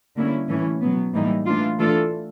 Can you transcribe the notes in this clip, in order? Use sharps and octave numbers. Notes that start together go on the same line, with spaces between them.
D3 G3 A#3 C#4 E4
A2 E3 A3 C#4
B2 F#3 B3
A2 E3 G3 A#3 D#4
E3 A3 D4 F4
E3 A3 D4 F4 A4